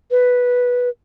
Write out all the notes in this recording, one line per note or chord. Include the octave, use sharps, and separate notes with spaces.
B4